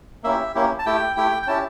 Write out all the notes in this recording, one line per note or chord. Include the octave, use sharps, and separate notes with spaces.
A#3 C#4 E4 G4 E5
A#3 C#4 E4 G4
A5
A3 E4 G4 G5
A3 E4 G4 G5
G5
C#4 E4 G4 A5